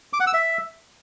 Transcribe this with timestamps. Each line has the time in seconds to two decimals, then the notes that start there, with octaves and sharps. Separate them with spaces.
0.13 D6
0.20 F#5
0.27 E6
0.34 E5